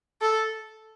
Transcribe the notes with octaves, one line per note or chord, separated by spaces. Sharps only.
A4